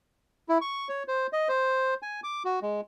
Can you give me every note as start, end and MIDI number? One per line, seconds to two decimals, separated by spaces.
0.49 0.58 64
0.61 0.88 85
0.89 1.03 73
1.08 1.27 72
1.33 1.48 75
1.48 1.94 72
2.02 2.20 80
2.24 2.43 86
2.45 2.60 66
2.62 2.81 56